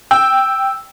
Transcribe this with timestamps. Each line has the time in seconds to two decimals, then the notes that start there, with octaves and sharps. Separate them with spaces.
0.11 G5 E6